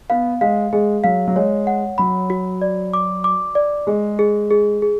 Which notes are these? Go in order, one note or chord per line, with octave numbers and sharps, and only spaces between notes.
B3 F5
G#3 F5
G#3 G#4
F#3 F5
F#3
G#3 C#5
F#5
F#3 B5
F#4
D5
D6
D6
D5
G#3 G#4
G#4
G#4
G#4